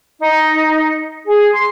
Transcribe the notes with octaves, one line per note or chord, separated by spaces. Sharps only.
D#4
G#4
C6